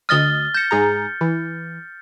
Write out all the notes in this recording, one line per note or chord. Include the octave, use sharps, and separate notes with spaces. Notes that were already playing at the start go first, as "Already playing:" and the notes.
D2 D#5 D#6 F6 A6 G7
G6 A#6 C#7 E7
G#2 G#4 A#5
E3